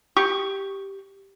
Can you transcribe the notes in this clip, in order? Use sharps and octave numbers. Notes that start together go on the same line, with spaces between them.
G4 C#6